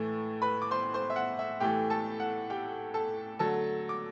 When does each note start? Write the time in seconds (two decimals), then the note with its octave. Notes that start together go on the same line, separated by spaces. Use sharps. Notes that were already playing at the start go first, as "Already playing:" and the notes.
Already playing: A2 E3 A3
0.42 B4 B5
0.62 D6
0.71 C5 C6
0.94 C5 C6
1.10 E5
1.16 F#5
1.39 E5
1.60 A2 E3 A3 G4 G5
1.90 A4 A5
2.20 F#5
2.50 G4 G5
2.94 A4 A5
3.39 D3 F#3 A3 A4 A5
3.89 D6